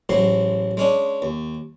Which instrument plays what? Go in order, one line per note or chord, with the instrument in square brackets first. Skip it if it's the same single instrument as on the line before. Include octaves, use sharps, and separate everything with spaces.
[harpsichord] A1 G#2 F#3 C6
G#3 C#4 D4
D#2